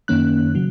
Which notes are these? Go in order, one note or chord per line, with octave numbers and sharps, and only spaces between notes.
F#2 D#3 A#3 C#4 F#6
C#3 F#3